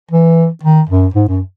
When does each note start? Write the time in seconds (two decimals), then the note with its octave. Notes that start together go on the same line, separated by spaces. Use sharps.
0.11 E3
0.63 D#3
0.89 F#2
1.14 G#2
1.28 F#2